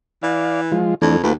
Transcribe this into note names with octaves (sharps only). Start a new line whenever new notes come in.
E3 D5 F5
F3 G#3 F4
F2 E3 A3 D4
D#2 A3 F4 B4